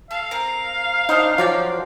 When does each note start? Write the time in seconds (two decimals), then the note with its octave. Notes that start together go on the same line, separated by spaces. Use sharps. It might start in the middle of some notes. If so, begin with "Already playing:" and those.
0.11 A4 F5
0.31 C4 A#4
1.09 D4 D#4 C5 F#5
1.38 F3 F#3 F#4 D5 G5